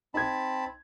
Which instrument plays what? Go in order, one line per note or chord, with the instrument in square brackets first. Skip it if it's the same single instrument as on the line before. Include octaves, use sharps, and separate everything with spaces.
[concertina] C4 A5 B5 [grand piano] D#4 G#6